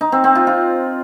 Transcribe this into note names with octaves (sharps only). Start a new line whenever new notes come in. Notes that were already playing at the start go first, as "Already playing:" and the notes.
D#4
C4
C4
F4
F4